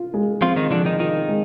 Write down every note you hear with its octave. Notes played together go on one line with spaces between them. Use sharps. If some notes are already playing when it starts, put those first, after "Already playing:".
Already playing: F4
G#3
F3 C4 F4
D#3 D#4
D3 F3 D4
D#3 D#4
D#3 D#4 F4
G#3